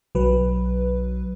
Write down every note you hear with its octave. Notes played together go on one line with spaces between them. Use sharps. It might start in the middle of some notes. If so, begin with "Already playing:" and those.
B1 F#3 B4